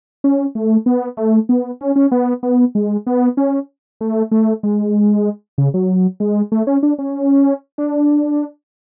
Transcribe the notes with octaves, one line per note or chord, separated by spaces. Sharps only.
C#4
A3
B3
A3
B3
C#4
C#4
B3
B3
G#3
B3
C#4
A3
A3
G#3
C#3
F#3
G#3
A3
C#4
D4
C#4
D4